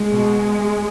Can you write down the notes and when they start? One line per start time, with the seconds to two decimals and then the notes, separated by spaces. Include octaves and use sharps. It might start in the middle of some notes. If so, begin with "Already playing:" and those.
Already playing: G#3
0.12 B2